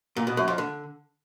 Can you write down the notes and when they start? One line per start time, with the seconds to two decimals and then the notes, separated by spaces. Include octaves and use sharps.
0.16 A#2
0.27 B2
0.37 F#2
0.48 F2
0.58 D3